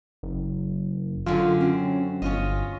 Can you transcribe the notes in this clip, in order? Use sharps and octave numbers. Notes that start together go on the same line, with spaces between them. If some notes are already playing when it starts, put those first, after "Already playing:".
F#1
F#2 D3 C#4 F4
C4 C#4
G1 C#4 F4 D#5